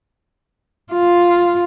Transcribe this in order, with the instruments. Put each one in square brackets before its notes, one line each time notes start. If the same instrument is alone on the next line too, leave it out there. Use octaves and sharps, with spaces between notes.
[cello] F4